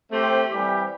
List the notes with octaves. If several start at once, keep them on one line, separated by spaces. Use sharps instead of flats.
A3 C4 G4
E3 G3 C4 G4